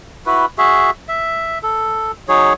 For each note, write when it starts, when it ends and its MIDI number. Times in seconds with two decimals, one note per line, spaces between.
0.26 0.46 64
0.26 0.46 66
0.26 0.46 71
0.58 0.91 66
0.58 0.91 68
0.58 0.91 76
1.08 1.58 76
1.63 2.12 69
2.28 2.53 54
2.28 2.53 63
2.28 2.53 68
2.28 2.53 73